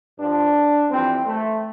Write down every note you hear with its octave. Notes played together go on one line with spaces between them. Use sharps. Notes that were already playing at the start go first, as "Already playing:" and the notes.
G2 F3 D4
F2 E3 G3 C4
A3